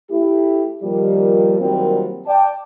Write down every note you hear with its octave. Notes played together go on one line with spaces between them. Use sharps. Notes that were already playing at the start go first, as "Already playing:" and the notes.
A3 E4 G4
A#2 D#3 F3 G3
A#2 D#3 F#3 G3 C4
D5 G5 A5